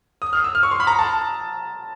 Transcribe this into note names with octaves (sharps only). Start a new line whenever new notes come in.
D#6
F6
E6
F6
C#6
C6
B5
A#5
A5